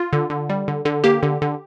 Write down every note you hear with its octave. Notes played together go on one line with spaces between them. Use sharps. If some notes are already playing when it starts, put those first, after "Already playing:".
Already playing: F4
D3
D3
G3
D3
D3
A#3 G4
D3
D3